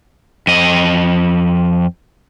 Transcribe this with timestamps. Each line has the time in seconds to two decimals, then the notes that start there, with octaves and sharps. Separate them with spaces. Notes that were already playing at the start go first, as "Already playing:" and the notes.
0.47 F2 D#5